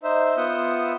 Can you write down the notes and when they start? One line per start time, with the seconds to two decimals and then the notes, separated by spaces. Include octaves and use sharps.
0.03 D#4 C5 E5
0.37 B3 F4 E5 F#5 D#6 G6